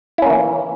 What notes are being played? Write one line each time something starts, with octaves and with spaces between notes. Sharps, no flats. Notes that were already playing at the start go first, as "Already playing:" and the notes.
E3 A#3 C#4 E4